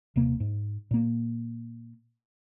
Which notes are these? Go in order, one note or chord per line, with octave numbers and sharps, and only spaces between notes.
D#1 C3 A#3
G#2
A#2 A#3